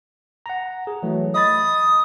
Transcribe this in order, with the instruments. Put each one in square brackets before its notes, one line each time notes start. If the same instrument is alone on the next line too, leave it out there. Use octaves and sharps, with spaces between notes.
[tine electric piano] F#5 A#5
G#4
E3 F#3 A3
[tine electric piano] D#5 B5 A6 [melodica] D#6